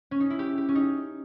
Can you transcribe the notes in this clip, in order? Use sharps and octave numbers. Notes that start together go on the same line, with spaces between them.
C#4
D#4
E4
G4
G4
C#4
D#4